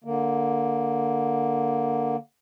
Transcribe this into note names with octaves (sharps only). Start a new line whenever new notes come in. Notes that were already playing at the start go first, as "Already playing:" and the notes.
D3 A#3